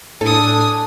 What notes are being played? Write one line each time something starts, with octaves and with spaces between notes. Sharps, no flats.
A2 D4 A4 G#5 D#6